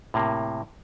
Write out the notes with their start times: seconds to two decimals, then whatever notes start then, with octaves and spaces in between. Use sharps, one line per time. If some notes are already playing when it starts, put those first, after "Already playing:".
0.14 A2 C3 A#3